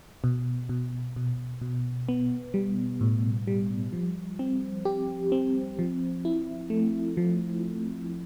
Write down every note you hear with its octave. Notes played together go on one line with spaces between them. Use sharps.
B2
B2
B2
B2
B3
G3
A2
G3
F3
C4
G4
C4
F3
E4
A3
F3